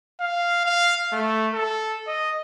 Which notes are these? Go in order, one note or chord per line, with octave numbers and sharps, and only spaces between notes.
F5
F5
A3
A4
D#5